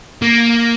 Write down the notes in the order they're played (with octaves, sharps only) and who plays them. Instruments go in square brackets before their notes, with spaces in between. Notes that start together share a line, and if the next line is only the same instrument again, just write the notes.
[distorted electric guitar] A#3